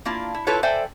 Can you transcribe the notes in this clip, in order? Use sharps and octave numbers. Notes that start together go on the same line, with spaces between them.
A#3 D4 E4 F4
E4
E4 F4 A4 B4 C#5
A4 C5 D5 E5 G5 G#5